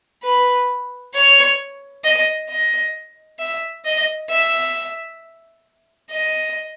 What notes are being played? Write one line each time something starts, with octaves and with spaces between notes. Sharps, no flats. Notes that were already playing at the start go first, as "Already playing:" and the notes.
B4
C#5
D#5
D#5
E5
D#5
E5
D#5